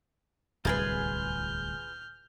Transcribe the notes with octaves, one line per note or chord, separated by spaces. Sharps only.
D1 C2 F4 G#4 B4 F6 G6